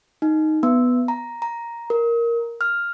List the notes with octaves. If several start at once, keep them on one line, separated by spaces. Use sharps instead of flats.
D#4
B3
A#5
A#5
A#4
F6